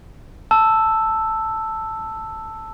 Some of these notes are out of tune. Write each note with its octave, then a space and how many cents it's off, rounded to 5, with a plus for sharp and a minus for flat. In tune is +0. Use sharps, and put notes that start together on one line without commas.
A5 +5 E6 +0